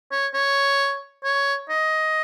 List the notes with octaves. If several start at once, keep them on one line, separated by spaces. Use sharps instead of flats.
C#5
C#5
C#5
D#5